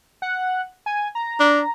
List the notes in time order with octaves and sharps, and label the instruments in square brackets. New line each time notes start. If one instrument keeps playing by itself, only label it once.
[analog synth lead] F#5
G#5
A#5
[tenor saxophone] D4